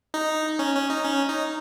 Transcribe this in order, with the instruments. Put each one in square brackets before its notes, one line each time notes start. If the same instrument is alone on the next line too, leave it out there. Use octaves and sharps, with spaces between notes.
[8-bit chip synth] D#4
C#4
C#4
D#4
C#4
D#4